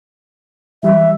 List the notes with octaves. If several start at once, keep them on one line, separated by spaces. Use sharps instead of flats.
E3 G3 E5